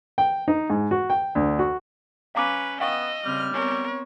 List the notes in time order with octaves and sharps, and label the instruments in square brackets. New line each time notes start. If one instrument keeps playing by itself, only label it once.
[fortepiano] G5
D#4
G#2
F#4
G5
D2
F#4
[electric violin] C#4 B4 [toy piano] F5 A#5 D6
[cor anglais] B3 [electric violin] D#5 [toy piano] F5 G5 C#6 [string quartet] E6
[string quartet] C#3 C4 F6 [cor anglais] G3
[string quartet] B3 C4 C#5 [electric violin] A#4